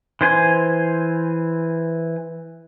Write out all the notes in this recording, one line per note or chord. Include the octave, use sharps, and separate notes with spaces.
E3 C5 G#5 C6